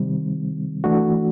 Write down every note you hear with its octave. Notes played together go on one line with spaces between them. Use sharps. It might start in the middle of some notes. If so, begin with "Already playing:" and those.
Already playing: C3 D#3 G3 C4
E3 A3 D4 F#4